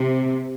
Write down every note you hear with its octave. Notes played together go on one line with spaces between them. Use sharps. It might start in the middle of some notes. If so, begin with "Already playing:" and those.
Already playing: C3